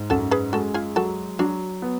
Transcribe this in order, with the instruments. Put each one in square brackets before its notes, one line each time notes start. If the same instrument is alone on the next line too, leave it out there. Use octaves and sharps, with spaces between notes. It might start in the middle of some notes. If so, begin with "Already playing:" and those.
Already playing: [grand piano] G#2
[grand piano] F#2 [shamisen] F#4 A4
[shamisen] G#4 B4
[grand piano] G#3 [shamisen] F#4 A4
[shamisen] F4 G#4
[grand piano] F#3 [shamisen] F#4 A4
[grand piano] F#3 [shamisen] D4 F#4
[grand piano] B3